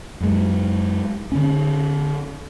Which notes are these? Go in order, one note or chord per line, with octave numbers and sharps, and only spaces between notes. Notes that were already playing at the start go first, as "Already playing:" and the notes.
F#2 G#3
D3 C#4